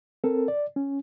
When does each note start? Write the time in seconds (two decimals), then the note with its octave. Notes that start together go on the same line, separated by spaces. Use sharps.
0.24 C4 A4 A#4
0.48 D5
0.76 C#4